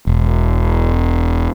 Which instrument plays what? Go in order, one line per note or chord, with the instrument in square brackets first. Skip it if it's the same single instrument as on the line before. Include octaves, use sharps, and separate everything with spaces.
[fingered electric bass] E1